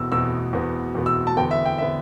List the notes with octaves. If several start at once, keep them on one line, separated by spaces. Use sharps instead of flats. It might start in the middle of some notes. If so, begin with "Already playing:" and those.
Already playing: E2 B2 B3 E6
E2 B2 B3 E6
E2 B2 B3
E2 B2 B3
E6
A5
E2 D3 B3 G5
E5
G5
D3 B3 E5